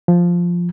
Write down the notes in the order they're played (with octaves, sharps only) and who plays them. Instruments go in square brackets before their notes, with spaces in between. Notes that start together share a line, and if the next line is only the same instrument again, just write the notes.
[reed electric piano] F3